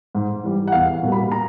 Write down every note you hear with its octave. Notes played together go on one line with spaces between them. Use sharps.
G#2
E3 G3
F#5
E2 F5
B2 G3 A#3
B5
B2 A#5